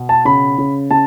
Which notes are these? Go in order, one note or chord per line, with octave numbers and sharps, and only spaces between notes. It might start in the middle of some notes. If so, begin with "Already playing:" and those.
Already playing: B2
A5
C#3 B5
C#3
C#3 A5